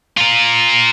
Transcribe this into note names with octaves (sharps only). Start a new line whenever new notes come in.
F4 A#4